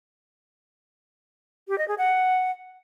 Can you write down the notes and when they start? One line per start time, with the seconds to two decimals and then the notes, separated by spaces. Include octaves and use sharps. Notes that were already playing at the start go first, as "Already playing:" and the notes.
1.68 G4
1.78 D#5
1.88 G#4
1.98 F#5